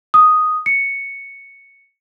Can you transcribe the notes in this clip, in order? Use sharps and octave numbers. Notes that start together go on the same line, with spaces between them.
D#6
C#7